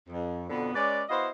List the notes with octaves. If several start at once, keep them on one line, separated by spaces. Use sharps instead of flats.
F2
F2 B2 D3 B3
G#3 C#4 B4 D5
B3 E4 F#4 C5 D#5 F5